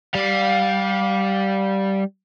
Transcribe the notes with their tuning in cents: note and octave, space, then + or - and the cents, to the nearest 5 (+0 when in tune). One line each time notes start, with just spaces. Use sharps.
G3 -10 F5 +20